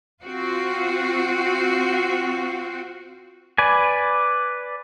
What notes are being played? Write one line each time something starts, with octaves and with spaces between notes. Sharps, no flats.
C4 F4 F#4
B4 D5 G#5